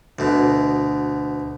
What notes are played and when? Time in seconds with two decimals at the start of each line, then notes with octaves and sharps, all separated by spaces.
0.19 D2 B2